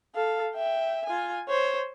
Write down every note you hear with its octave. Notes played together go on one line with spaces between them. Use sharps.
A4 F5
E5 G5
F4 G#5
C5 C#5